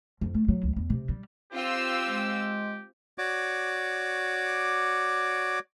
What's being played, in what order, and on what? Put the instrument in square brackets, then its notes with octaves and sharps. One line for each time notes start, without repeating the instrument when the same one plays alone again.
[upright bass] F2
A3
F#3
C#2
E2
C3
G3
[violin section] C4 F4 E6 [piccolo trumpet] G4
[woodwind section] G#3
[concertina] F#4 C#5 D5 D6